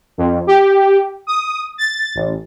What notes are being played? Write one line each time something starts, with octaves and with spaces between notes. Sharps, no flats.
F2
G4
D#6
A6
A1